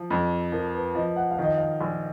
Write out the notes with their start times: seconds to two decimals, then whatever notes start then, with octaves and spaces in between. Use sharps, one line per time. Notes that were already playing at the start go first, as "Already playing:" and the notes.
Already playing: F3
0.10 F2
0.52 F3 A#4
0.74 B4
0.95 F3 D#5
1.16 F#5
1.31 F5
1.38 D#3
1.44 D#5
1.57 F5
1.81 A#1